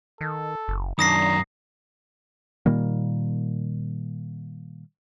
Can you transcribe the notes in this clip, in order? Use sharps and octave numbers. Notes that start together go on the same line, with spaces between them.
D#3 A4
F#1
F#2 D#3 D4 A#5 D#6 A#6 C7
A#2 D#3 G3 A#3